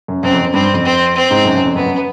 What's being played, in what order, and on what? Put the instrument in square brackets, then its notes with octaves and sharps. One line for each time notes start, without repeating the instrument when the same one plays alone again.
[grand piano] F#2
[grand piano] F#2 [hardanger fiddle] C4
[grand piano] F2
F#2
[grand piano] G2 [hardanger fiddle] C4
[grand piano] F2
[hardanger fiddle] C4
C4
[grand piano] G#2
F#2
F#2
F2
[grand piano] F#2 [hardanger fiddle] B3
[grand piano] F#2